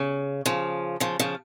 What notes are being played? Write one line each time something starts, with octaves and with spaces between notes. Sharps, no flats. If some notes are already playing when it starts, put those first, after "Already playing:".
Already playing: C#3
C#3 F3
C#3 F3
C#3 F3